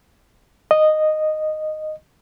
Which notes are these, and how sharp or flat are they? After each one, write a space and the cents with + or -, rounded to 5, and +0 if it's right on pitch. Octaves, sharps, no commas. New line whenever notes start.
D#5 -10